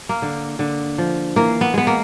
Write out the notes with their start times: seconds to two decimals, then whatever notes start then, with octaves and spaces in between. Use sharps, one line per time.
0.09 A#3
0.22 D3
0.59 D3
0.98 F3
1.36 E3 A#3
1.61 B3
1.74 G#3 B3
1.87 A#3